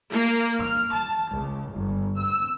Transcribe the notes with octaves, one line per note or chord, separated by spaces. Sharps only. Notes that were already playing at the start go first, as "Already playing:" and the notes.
A#3
F6
A5
C#2
G1
E6